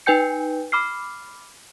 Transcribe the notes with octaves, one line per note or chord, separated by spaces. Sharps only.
D#4 B4 G5 G#5 G6 C#7
B5 D6 F6 C7